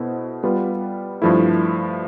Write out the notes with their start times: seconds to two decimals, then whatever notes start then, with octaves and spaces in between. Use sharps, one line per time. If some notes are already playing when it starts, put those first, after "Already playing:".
Already playing: B2 B3 E4 A4 C5
0.43 G3 B3 F4 B4
1.22 G2 F3 A3 E4